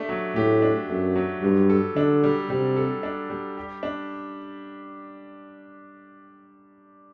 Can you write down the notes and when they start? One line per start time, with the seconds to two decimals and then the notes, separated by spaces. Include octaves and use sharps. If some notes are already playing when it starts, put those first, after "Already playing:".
Already playing: A3 D4 G4
0.09 F#3
0.36 A2 G4
0.62 D4
0.89 F#2 A3
1.16 F#3
1.43 G2 G3
1.69 A4
1.96 D3 D4
2.24 G3
2.50 C3 G3
2.76 A4
3.03 D4
3.30 G3
3.57 G4
3.83 D4